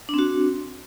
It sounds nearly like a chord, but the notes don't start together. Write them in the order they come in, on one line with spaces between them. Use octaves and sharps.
D4 C4 F#4